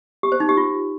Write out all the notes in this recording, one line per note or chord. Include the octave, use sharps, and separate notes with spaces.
G4
C5
D#4
G4
F4